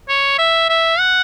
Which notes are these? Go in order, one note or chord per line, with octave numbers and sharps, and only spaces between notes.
C#5
E5
E5
F#5